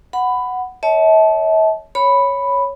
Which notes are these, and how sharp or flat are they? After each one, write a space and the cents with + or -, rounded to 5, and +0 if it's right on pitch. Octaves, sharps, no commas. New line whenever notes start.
F#5 +0 B5 +15
C#5 +20 E5 -45 A5 -20
C#5 +0 B5 +0